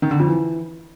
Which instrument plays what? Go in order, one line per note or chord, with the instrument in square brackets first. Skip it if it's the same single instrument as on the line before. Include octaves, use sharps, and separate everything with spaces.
[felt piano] D#3
D3
F2
E3